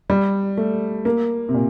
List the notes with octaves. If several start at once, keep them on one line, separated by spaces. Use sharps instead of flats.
G3
A3
A#3
C3
A#2